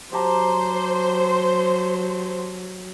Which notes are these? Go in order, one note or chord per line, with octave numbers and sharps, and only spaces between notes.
F#3 G4 C5 A5 A#5